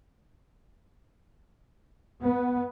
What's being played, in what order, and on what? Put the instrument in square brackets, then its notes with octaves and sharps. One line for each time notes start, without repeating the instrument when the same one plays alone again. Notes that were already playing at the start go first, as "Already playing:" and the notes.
[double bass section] B3